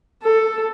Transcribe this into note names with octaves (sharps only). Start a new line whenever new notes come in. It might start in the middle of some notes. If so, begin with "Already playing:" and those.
A4